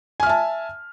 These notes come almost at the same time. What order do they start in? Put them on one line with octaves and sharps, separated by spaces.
G#5 F6 E5 A5